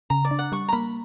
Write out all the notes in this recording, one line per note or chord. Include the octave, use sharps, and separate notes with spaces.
C#3 A#5
D5
D4
F#5
G3 C#6
A#5
A#3 B5